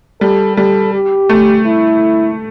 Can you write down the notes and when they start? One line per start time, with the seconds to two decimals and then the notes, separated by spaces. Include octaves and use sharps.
0.21 G3 A4
0.57 G3 A4
0.94 G4
1.29 A3
1.66 E4